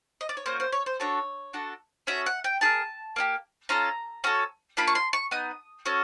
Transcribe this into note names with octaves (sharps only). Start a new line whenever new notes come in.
D#5
D5
C#5
A#3 C#4 F#4 C5
C5
C#5
C5
D4 F#4 A4 C#5
D4 F#4 A4
C#4 F#4 A4 E5
F#5
G5
A#3 D#4 G#4 A5
A#3 D#4 G4
C#4 F4 A4 A#5
C#4 F#4 A4
A#3 D4 F4 B5
C#6
C6
C#6
B3 D#4 D#6
C#4 F#4 A4